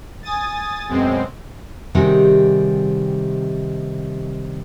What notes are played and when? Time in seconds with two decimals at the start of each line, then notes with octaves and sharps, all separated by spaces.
0.23 G#5 D#6 A6
0.88 F#2 B2 G#3 C4
1.95 C3 D#3 G3 D#4 F#4 G#4